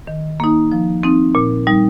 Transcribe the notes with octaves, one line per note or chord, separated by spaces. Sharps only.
D#3
A#3 D#4
F3
C4 D#4
A#2
G3 D#4